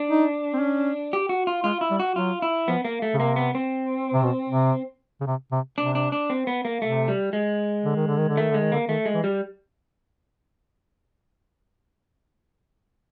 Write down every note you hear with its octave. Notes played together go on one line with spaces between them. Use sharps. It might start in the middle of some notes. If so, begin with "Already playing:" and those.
Already playing: D4
D#4
C4
C#4
G4
F#4
F4
G#3 F4
E4
G3
F#4
F#3 F4
E4
F3 B3
A#3
A3
C#3
C3 A#3
B3
C4
C3
B2
C3
C#3
C3
C3
C3 D4
D4
D4
C4
B3
A#3
C3 A3
G3
G#3
D3
D#3
D3
D#3
D3
D#3 A3
D3 G#3
D#3
D3 A#3
D#3 A3
G#3
E3
G3